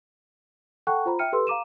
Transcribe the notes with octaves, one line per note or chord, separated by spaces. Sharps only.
A4 F#5 G5 A5 C#6 F#6
F4 C5 A#5 B5
E5 G5 F6 C#7 D#7
G4 A4 B4 C6 E6
F5 A#5 D6 D#7 E7